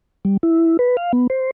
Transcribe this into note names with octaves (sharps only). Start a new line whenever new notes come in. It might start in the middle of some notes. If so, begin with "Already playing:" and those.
G3
E4
B4
F5
B3
C5